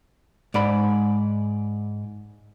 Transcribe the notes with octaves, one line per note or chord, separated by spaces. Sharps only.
G#2 D5 B5